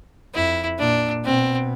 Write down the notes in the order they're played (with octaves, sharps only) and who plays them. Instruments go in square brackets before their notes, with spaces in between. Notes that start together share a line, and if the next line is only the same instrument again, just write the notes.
[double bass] F2 [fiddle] E4
[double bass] A#2 [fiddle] D4
[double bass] B2 [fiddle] C4